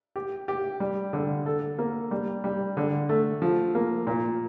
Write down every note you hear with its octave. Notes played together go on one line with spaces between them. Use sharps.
G4
G4
G3
D3
A4
A#3
G3
G3
D3
A3
F3
A#3
A#2